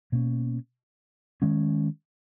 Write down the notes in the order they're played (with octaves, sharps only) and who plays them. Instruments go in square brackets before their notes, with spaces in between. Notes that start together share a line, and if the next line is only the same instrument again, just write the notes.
[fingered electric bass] B2 A#3 C#4
D#3 G#3 C#4